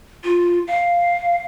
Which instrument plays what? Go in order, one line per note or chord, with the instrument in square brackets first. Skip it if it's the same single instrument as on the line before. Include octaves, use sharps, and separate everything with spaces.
[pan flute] F4
F5